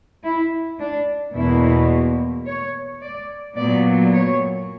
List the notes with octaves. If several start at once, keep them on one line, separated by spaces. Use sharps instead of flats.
E4
D4
E2 B2 A#3 E4
C#5
D5
A#2 F#3 B3 D5
C#5